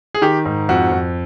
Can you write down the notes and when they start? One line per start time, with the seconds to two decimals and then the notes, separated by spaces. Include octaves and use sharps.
0.15 G#4
0.22 D#3 G4
0.45 G#2
0.69 F2 F#4
0.92 F2